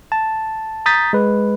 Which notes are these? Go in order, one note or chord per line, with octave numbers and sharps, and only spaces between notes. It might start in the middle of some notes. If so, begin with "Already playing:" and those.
A5
A#5 D#6 G6 A6 B6
G#3 B4